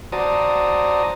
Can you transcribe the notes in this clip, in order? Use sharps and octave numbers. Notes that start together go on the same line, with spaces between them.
F#4 C5 D5 A5 A#5 D#6